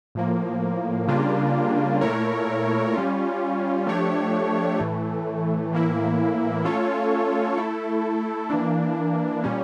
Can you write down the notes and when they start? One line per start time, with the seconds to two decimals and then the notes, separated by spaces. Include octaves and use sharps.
0.15 A2 F3 A#3
1.08 C#3 G3 A#3 D4 F4
2.01 A#2 A3 E4 A#4 C#5
2.94 G3 C#4 F4
3.86 F3 A3 D4 G4 C#5
4.79 A2 E3 A3
5.71 A2 E3 A#3 E4
6.64 A3 C#4 F4 A4 C#5
7.57 A3 E4 A4
8.50 E3 A#3 D4
9.44 A#2 G3 C#4